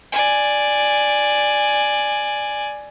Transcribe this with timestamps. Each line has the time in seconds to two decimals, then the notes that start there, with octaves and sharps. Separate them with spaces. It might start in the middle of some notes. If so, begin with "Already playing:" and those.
0.12 D5 G#5